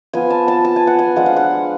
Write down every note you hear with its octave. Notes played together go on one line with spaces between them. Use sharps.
F3 B3 F4 G#5
A5
A5
A5
G#5
F#5
G#5
F3 G#3 D4 F4 F#5
F5
F#5